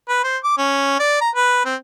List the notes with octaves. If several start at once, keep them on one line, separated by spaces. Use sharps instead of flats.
B4
C5
D6
C#4
D5
A#5
B4
C4